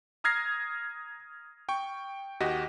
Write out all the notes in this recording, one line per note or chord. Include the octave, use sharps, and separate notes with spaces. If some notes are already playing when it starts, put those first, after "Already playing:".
A#5 D#6 F6 G#6 A#6 C7
G5 C#6
D#2 F#4 G4 D#5